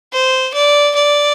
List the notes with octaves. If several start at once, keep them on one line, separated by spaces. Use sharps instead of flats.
C5
D5
D5